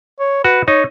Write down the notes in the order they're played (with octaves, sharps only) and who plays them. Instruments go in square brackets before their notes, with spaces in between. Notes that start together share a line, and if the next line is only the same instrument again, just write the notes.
[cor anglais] C#5
[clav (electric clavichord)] F#4 [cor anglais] B4
[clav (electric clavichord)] D#4 [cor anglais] C#5